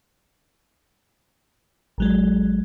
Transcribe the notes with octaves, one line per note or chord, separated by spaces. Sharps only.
A1 F#3 G#3